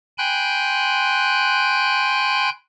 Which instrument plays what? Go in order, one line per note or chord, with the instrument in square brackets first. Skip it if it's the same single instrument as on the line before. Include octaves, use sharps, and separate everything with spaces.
[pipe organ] G5 G#5 B5 C6 F#6 G6